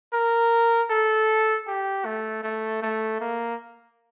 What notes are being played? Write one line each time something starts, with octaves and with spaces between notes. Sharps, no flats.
A#4
A4
G4
A3
A3
A3
A#3